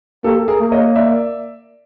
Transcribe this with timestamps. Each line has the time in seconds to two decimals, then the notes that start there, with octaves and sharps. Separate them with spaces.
0.24 A#3 G4 A4
0.48 G#4 A#4
0.60 A#3
0.72 C#5 D#5
0.96 D5 E5